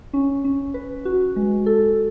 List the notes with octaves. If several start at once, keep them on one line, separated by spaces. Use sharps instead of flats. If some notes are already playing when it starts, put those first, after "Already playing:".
C#4
C#4
B4
F#4
G#3
A4